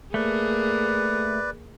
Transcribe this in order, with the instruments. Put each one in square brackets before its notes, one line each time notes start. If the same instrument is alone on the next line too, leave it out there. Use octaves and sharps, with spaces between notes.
[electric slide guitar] A3 [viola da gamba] A#3 G#4 [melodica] B4 D5